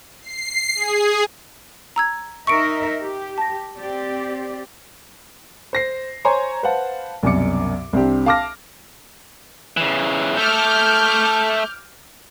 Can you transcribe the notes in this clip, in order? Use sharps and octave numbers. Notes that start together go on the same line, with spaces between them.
C7
G#4
A#5 E6 G#6
D#4 A#4 E5 C#6 C#7 D7
G4
A5 A#6
C4 G4 D5
C5 A#6 C7
C5 C#5 G#5 A#5 C6
B4 C5 F5 F#5 A5
C2 F#2 B2 D5 D6 C#7
C2 C4 D4 G4
F5 A5 D6 F6 A#6
C#3 E3
A3 A4 D6 F6 G6